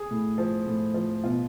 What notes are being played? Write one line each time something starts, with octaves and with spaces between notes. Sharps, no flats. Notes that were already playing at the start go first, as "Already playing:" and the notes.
Already playing: G#4
A2
F3
A2
F3
B2 F4